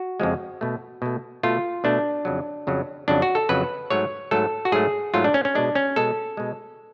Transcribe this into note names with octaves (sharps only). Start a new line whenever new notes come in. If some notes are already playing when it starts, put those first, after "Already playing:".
Already playing: F#4
F2 C#3 F3 G#3
B2 A3
B2 A3
B2 A3 F4
B2 A3 D4
F2 C#3 F#3
F2 C#3 F#3
F2 C#3 F#3 D4
F#4
A4
F2 C#3 F#3 B4
G#2 F#3 A3 C#5
G#2 F#3 A3 A4
F#4
G#2 F#3 A3 G#4
G#2 F#3 A3 F4
D4
C#4
C#4
B2 G#3 D4
C#4
B2 G#3 A4
B2 G#3